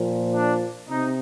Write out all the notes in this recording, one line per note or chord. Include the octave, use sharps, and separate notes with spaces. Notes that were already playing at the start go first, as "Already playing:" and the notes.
Already playing: A#2 F3
D4
C3 D#4